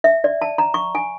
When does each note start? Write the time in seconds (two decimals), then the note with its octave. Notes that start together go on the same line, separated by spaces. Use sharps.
0.04 E5
0.24 D5
0.42 A5
0.58 A#5
0.74 C#6
0.95 G#5